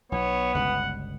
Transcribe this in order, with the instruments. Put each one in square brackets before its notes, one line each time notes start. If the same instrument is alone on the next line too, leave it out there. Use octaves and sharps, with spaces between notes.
[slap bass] B1 [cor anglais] B3 [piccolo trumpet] C#5
[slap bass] G1 C#2 B2 [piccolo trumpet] F#5